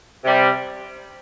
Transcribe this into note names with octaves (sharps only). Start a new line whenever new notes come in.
C3 G3